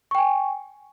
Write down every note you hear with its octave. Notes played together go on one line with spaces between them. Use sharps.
G5 G#5 C#6